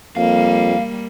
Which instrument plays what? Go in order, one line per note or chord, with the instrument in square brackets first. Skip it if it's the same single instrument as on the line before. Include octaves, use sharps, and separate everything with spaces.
[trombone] F2 [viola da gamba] G3 A#3 [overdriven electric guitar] F5